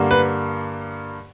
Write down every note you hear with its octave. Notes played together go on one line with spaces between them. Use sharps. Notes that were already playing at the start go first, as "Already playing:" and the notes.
Already playing: G2 D3 G3 A#3
B4